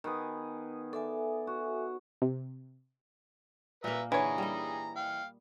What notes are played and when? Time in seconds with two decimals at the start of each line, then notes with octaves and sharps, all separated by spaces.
0.04 D#3 B3 G#4
0.93 A4 D5 E5 G#5
1.47 F#4
2.22 C3
3.84 A#2 A#3 B4 E5 A#5
4.12 D3 E3 G#4 C#5 A#5
4.38 G3 D#5
4.96 F5 G5